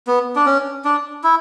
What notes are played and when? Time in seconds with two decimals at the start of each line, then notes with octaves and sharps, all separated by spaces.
0.07 B3
0.36 D4
0.46 C#4
0.85 D4
1.24 E4